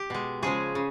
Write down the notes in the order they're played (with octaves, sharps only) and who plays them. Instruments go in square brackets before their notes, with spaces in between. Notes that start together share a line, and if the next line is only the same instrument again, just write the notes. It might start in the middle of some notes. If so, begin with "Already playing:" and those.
Already playing: [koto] G4
B2 G#3
C#3 F3 G#3 G#4
C#3